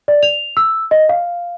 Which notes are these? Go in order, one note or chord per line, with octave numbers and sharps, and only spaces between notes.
D5
F7
E6
D#5
F5